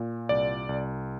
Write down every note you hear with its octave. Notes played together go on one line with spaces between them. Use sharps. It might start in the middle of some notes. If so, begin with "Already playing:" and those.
Already playing: A#2
C2 D5
C2